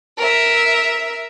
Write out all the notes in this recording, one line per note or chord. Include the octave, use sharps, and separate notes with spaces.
A#4 E5